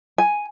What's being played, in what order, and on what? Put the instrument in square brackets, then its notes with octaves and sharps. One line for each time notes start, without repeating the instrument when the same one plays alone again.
[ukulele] G#5